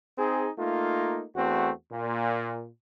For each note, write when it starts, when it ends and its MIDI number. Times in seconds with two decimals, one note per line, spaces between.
0.18 0.50 60
0.18 0.50 63
0.18 0.50 68
0.58 1.24 57
0.58 1.24 58
0.58 1.24 63
0.58 1.24 65
1.35 1.71 40
1.35 1.71 57
1.35 1.71 60
1.35 1.71 66
1.91 2.68 46